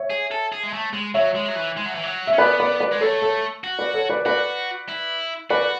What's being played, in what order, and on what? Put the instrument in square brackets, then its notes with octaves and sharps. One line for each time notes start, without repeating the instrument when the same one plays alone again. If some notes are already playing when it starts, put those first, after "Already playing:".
Already playing: [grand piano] C#5 E5
[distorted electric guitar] G#4
A4
G#4
G#3
A3
G#3
[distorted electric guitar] F#3 [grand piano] C#5 E5
[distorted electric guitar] G#3
F#3
E3
G#3
F#3
E3
F#3
[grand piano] E5
[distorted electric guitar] C#4
[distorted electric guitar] B3 [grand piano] B4 D5
[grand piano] B4 D5
B4 D5
[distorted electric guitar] G#3
[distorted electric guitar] A3 [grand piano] A4 C#5
[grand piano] A4 C#5
[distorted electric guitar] F#4
[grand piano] B4 D5
A4 C#5
B4 D5
[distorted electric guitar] F#4 [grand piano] B4 D5
[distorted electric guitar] E4
[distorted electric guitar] F#4 [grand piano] B4 D5